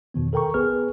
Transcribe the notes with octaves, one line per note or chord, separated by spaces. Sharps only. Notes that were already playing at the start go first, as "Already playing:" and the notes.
E2 B2 D#3 B3
A4 A#4 G5 A#5 C#6
A1 B3 G#4 B4 F6